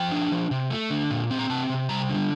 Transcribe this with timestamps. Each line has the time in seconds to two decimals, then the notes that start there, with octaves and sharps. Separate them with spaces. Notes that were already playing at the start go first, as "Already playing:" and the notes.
Already playing: F3 G5
0.12 D4
0.32 F3
0.51 C3
0.70 A3
0.90 D3
1.11 A#2
1.31 C4
1.39 A#5
1.50 C3 A5
1.69 C3
1.89 G3 A#5
2.10 D3